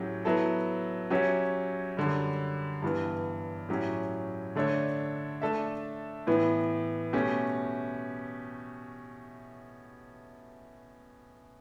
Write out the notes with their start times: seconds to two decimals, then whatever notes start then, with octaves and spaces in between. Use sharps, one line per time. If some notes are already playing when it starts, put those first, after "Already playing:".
Already playing: A2 F#3 C#4 G4
0.25 F#3 B3 E4 A4
1.10 F#3 C#4 G4 C#5 E5
1.97 F#2 D3 G3
2.82 G2 E3 B3
3.69 A2 F#3 C#4 G4
4.55 D3 A3 D4 A4 C#5
5.42 A3 D4 A4 E5
6.27 A2 E3 B3
7.13 B2 A3 C#4 G4